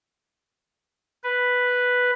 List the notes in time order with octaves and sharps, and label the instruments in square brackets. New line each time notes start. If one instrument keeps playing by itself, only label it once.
[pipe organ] B4